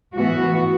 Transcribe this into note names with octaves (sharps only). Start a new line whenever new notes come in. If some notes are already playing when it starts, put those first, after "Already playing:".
A2 E3 B3 F#4